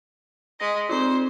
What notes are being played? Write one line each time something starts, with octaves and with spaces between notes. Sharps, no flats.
G#3 D#5 A#6 B6
C4 D#4 F4 C5